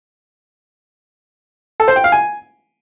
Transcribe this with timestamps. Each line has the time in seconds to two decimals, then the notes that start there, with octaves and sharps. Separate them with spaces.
1.80 A4
1.88 C5
1.96 G5
2.04 F5
2.12 G#5